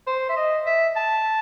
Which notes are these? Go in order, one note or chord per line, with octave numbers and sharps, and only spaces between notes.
C5
E5
D#5
E5
A5